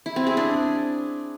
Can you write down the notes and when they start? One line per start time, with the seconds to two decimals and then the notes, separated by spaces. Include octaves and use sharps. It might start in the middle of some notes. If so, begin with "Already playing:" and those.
0.06 E4
0.16 C4
0.27 G#4
0.37 D4